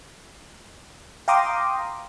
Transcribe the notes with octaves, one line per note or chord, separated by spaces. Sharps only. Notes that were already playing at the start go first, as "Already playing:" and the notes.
F5 G5 A#5 C6 D6 D#6